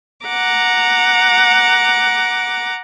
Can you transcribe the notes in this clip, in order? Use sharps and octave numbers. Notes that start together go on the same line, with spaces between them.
F#5 A#5 D6